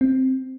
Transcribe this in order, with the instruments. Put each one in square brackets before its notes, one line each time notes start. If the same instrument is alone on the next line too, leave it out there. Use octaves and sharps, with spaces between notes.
[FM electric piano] C4